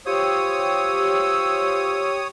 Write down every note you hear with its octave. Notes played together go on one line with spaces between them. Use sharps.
F4 G4 C5 C#5 D#6 E6